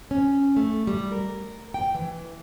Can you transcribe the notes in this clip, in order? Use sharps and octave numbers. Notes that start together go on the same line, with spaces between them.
C#4
A3
G3
A#4
G5
E3